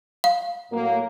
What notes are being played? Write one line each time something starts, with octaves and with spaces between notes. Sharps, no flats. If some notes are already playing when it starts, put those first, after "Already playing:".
F5
A2 F#3 A#3